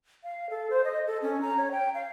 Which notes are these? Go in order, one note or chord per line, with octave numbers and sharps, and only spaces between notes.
F5
A4
C5
D#5
A4
C#4
A#5
C#5
G5
F5